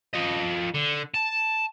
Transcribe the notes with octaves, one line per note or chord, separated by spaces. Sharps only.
F3 D#5
D3
A5